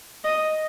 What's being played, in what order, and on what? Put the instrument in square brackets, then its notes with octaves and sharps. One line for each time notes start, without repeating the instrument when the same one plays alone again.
[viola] D#5